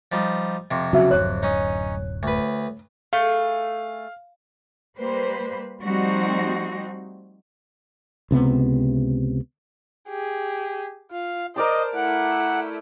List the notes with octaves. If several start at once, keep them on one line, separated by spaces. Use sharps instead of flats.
F3 G3 D#4
F2 C3
C#3 F#3 F#4 E5
D1 F#2 C#5 F#6
C#4 D#4
D2 B4
A3 G#4 F5
G3 A#3 B4 C5
F3 G3 A3 C4 D#4 F#4
C#2 C3 B3
G4 G#4
F4 F5
A#4 C5 D5 D#5 A5
A3 E4 F#5